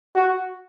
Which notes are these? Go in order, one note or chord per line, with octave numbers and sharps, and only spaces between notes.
F#4